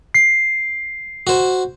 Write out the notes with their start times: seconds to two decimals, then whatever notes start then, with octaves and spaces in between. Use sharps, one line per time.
0.14 C7
1.27 F#4 C5